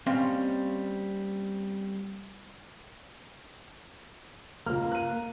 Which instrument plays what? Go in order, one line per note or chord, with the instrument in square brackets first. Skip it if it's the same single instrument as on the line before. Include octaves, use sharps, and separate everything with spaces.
[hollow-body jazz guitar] G3 A#3 C4 C#4 D#5 F5
[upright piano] C#2 F4 F6 [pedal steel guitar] A#3
[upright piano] F#6 D#7